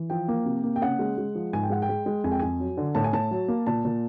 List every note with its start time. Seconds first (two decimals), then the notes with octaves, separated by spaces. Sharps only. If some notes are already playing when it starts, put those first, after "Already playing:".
Already playing: E3
0.10 F3 G5
0.28 A#3
0.45 C3
0.63 A#3
0.76 G5
0.82 C#3 F#5
0.99 G#3
1.18 G#3
1.35 F3
1.53 G#2 G#5
1.63 G5
1.70 G#3 F#5
1.82 G5
1.89 G#3
2.06 G#3
2.24 F2 G#5
2.32 G5
2.39 F2 G#5
2.60 F#3
2.77 D3
2.95 A2 A5
3.04 G#5
3.13 A2 A5
3.31 F#3
3.48 A#3
3.67 A#2 A5
3.85 A#2